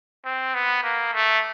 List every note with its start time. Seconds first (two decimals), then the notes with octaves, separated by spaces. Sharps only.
0.25 C4
0.54 B3
0.83 A#3
1.13 A3